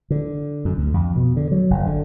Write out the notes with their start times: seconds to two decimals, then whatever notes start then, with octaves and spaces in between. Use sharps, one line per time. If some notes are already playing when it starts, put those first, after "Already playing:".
0.10 D3
0.65 F#2
0.78 D2
0.94 F2
1.16 B2
1.36 D3
1.51 F#3
1.70 F#1
1.86 D3